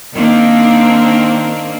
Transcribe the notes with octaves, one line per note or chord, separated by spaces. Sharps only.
D#3 A#3 C4 D4